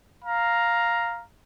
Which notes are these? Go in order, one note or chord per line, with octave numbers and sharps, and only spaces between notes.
F5 A#5